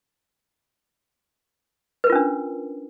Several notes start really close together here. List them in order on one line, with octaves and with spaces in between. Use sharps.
B4 A#4 F4 C#4 D4